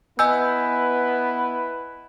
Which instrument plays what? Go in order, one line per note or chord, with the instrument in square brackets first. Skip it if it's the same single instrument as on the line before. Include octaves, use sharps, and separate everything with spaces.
[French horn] B3 [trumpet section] E4 B4 [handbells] D#5 G#5 G6 [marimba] E6